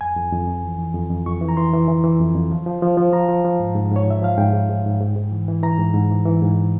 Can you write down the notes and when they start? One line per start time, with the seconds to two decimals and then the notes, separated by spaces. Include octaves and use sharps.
0.01 F2 G#5
0.16 F2
0.33 F2
0.48 F2
0.63 E3
0.79 E3
0.94 F2
1.10 F2
1.26 F2 C#6
1.41 E3
1.49 A#5
1.57 E3 C6
1.73 E3
1.88 E3
2.04 E3
2.20 F2
2.35 F2
2.51 F3
2.66 F3
2.82 F3
2.97 F3
3.13 F3 A#5
3.29 F3
3.45 F3
3.60 G#2
3.75 G#2
3.92 G#2 C#5
4.07 F3 E5
4.22 F3 F5
4.38 G#2 G5
4.54 G#2
4.70 G#2
4.86 G#2
5.01 G#2
5.16 G#2
5.32 E3
5.48 E3
5.63 E3 A#5
5.79 G#2
5.94 G#2
6.10 E3
6.25 E3
6.42 G#2